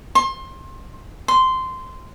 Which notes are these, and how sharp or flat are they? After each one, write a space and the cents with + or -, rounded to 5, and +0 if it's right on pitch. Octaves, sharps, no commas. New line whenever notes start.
C6 +25
C6 -10